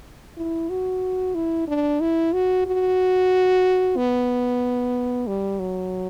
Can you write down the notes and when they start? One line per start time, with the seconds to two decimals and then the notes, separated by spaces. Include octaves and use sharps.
0.37 E4
0.70 F#4
1.35 E4
1.68 D4
2.00 E4
2.33 F#4
2.66 F#4
3.97 B3
5.27 G3
5.59 F#3